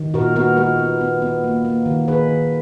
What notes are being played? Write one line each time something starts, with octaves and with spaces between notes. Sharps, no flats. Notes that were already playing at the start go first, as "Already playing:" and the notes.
Already playing: D#3
A#2 F#4 A#4
B3 F#4 A#4
G#3 F#4 A#4
B3
B3
B3
A#3
A#3
D#3
D#3 G#4 B4
D#3